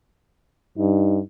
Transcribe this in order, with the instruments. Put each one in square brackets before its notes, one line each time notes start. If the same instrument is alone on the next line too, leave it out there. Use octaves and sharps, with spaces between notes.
[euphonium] G2 [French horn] D#4